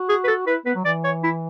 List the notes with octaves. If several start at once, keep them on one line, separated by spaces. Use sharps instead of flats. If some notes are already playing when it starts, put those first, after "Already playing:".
Already playing: F#4
G#4
B4
A4
E4 B4
B3 B4
F#3
E3 D5
C#5
E4